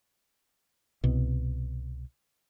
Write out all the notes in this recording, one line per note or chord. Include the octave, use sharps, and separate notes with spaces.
C2 B2